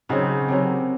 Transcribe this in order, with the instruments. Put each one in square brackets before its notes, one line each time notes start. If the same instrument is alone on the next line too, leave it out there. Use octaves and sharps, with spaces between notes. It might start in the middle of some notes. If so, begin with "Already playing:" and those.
[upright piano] C#3 [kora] F#3 C4 D#4 F#4
[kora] C3 D#3 F#3